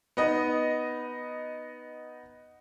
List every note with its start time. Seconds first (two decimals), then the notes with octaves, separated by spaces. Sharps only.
0.17 B3 D#4 D#5